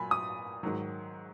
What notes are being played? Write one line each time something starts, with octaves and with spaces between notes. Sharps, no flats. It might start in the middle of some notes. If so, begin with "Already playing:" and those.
Already playing: A#2 F#3 G#5 B5
D#6
G#2 D#3 F#3